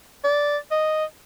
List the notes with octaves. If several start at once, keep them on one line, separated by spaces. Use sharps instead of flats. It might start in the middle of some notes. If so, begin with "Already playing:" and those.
D5
D#5